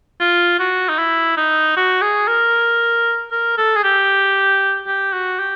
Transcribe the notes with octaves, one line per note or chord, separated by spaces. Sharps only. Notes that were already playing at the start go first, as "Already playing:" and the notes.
F4
F#4
D#4
E4
D#4
F#4
G#4
A#4
A#4
A4
G#4
G4
G4
F#4
G4